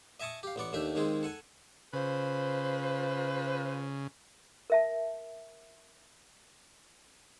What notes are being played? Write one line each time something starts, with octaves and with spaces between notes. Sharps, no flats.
D#5 E5 G#5 A5 C#6 D#6
G4 F5
A1 B3 D5 C#6
D#2 A3 D4 G4 E5
D#2 G#3 C4 G#4
A4 F#5 G#5
C#3 F4 B4 C5
A#4 E5 A5